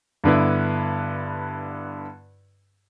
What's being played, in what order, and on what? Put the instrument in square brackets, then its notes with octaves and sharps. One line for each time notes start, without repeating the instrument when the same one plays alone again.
[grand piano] G2 D3 B3 E4